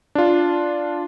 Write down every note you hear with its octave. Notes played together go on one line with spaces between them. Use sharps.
D4 F4